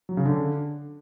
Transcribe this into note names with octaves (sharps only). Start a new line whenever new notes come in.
F#3
C#3
D3